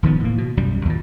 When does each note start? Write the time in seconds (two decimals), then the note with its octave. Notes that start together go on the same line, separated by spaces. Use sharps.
0.03 D#1 D#3 F3 B3
0.20 A2 A#3
0.38 B2
0.57 B1 F#2 G3
0.85 D#2 A#2